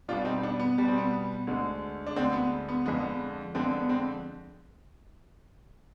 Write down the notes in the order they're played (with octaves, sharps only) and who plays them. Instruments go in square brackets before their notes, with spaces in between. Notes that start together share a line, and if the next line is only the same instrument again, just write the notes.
[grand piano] B2 G3 B3 D4 F4
C4 D#4
B3 D4
B3
B2 G3 B3
C4
B3
D2 D3 G#3
D4
D2 D3 G#3 C4
B3
B3
F2 D3 G#3 B3
F2 D3 G#3 B3 C4
B3
C4